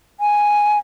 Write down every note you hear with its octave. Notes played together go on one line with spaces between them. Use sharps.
G#5